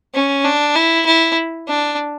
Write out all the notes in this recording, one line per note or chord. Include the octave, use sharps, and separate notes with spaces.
C#4
D4
E4
E4
D4